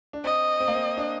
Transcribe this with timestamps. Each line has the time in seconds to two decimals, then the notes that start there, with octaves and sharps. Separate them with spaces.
0.13 D4
0.24 C4 D#5
0.60 C4
0.68 A#3
0.75 C4
0.97 D4